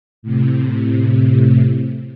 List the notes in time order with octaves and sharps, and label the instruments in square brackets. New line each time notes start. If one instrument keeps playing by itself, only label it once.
[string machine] A2 C3